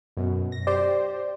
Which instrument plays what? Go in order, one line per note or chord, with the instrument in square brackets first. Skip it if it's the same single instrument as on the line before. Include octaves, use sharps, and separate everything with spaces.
[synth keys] F#2 B2
A#6
[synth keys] G4 C5 [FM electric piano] D5